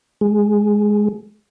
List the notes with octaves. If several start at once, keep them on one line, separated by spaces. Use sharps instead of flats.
G#3